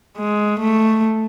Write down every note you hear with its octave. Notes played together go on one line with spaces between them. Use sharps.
G#3
A3